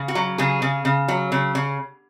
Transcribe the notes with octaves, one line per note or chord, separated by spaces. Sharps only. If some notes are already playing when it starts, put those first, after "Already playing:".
Already playing: C#3
F#4
F#3
C#3 G#4
C#3
C#3
F#3
C#3
C#3